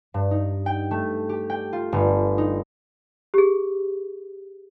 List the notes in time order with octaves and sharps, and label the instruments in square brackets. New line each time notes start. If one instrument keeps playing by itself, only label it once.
[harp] G2
D#4
G5
A3
G4
G5
F4
G1
D#4
[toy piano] G4 G#4